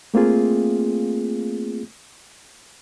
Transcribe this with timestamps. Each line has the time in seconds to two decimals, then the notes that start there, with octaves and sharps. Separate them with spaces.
0.14 A3 A#3 C4 F4 G#4